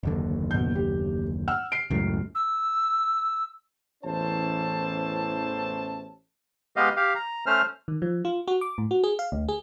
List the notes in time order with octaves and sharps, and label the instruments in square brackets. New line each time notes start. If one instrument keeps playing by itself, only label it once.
[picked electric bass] F#1 D#2 D3
[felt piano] B2 G6
G4
F#5 E6 F6
C7 D7
[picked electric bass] C#2 F#2 A2
[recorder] E6
[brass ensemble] A1 E2 C#4 E4 C5 A5
[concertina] G#3 B3 G4 D#5 F5
G4 F5
A#5
A3 C#4 C5 F6
[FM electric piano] D#3
F3
F4
F#4
D6
A2
F#4
G#4
F5
D2
G#4